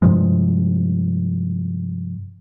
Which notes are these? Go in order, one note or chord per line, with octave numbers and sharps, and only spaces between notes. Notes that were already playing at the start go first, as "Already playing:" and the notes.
G2 C3 F3 G#3